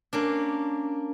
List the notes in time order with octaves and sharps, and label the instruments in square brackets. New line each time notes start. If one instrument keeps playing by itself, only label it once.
[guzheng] A#3 C#4 D4